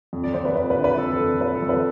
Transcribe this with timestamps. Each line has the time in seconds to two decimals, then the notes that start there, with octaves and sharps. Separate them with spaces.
0.13 F2
0.24 D5
0.34 F2 C5
0.45 B4
0.56 F2 B4
0.70 B4
0.76 D3
0.84 B4
0.98 F2 A4
1.12 A4
1.20 F2
1.41 F2 B4
1.55 A4
1.62 F2
1.69 B4